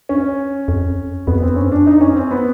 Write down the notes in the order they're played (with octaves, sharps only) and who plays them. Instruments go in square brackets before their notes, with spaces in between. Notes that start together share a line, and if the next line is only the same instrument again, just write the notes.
[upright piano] C#4
[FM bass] F2
[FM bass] F2 [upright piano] B3
[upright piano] C4
[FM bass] F#2 [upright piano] C#4
[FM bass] G2
[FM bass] F#2 [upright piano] D4
[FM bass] F2 [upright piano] D#4
[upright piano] C#4
C4
B3